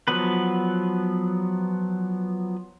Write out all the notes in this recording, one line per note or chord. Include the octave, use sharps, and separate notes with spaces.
F3 F#3 B3 B4